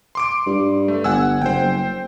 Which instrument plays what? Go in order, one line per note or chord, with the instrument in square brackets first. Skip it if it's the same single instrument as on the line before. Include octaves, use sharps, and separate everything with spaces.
[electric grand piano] C6 D6 D7
[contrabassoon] G2
[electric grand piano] A3
[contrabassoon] G1 [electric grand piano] F#5 G#5 E6
[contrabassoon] F#1 [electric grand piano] C5 G5